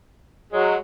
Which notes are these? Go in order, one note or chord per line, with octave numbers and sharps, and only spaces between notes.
F#3 G#3